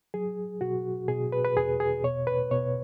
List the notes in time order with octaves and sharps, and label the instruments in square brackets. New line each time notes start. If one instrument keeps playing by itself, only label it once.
[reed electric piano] F#3 G#4
B2 F#4
B2 G#4
B4
B4
E2 G#4
G#4
B2 C#5
B4
B2 C#5